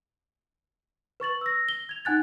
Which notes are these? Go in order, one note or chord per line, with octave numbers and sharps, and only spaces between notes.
B4 C#6 A6 F#7
E6 A#6
G7
G#6 F7
D#4 F#5 G#5 F#6 A6